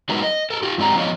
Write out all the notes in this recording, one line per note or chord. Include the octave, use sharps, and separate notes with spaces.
F#3 G#3 B3 D#4 A#4 B4
D#5
A4 A#4
F4 G4
G2 G#3 C4 G4 D5 A#5
F3 B3 F4 C#5 D#5